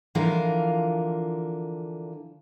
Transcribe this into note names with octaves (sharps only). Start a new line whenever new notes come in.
D3 E3 F3 F4 A#4